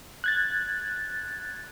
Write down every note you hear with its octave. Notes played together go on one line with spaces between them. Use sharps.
F#6 G#6 A6